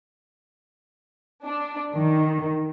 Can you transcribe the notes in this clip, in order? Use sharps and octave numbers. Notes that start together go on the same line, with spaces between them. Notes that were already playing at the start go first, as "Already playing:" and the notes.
D4
D#3